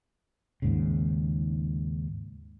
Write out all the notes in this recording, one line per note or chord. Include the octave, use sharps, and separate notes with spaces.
D#2 G#2 C#3